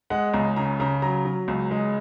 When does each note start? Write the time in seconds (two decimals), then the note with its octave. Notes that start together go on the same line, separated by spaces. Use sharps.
0.10 G#3 F#5
0.33 C#2 A#5
0.56 C#3 A#5
0.80 C#3 A#5
1.02 F#3 A#5
1.25 F#3
1.48 C#2
1.71 G#3